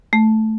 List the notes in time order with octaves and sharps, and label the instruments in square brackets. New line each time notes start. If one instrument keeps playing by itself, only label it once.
[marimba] A3